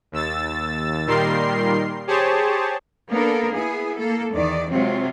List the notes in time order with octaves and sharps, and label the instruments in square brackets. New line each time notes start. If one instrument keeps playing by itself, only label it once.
[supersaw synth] D#2 E6 A6
A#2 D#3 G3 A#4 C6 C7
G4 G#4 C5 C#5 A5
[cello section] A#3 B3 D4 A4 A#4
B3 E4 G#4
A#3 A4
E2 D#3 D5
C3 F#3 G#3 C4 F4